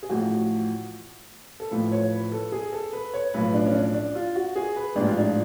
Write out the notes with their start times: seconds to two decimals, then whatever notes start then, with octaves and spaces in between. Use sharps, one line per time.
0.03 G#4
0.09 A1 A2 F3 F#4
1.60 A4
1.71 A1 A2 F3 B4
1.92 C#5
2.12 B4
2.32 A4
2.52 G#4
2.73 A4
2.93 B4
3.14 C#5
3.34 B1 A2 F3 B4
3.54 D4
3.65 C#4
3.74 D4
3.94 D4
4.15 F4
4.35 F#4
4.56 G#4
4.76 B4
4.95 A1 G#2 F3 D4
5.07 F4
5.18 D4